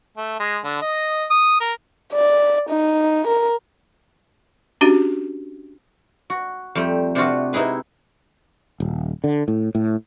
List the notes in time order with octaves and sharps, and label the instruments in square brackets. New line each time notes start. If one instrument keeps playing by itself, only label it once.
[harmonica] A3
G#3
D3
D#5
D#6
A#4
[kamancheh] D5
D#4
A#4
[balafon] C#4 D4 F#4 G4
[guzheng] F#4
F2 G3 A3 G5
C3 D4 F4 F#4
C3 D#4 E4 G#4 B4
[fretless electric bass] D#1
D3
A2
A2